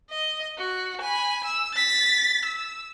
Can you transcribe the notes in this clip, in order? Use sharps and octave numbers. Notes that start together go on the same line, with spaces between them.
D#5
F#4
G#5 B5
E6
A6 B6
E6